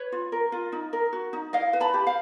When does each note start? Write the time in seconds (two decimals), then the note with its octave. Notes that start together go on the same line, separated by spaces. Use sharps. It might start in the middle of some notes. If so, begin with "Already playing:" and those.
Already playing: B4 C#5
0.12 F4
0.32 A#4
0.52 F4
0.72 D#4
0.93 A#4
1.13 F#4
1.33 D#4
1.53 E4 D#5 F5
1.73 B4
1.80 A5 B5
1.94 G4
2.07 F5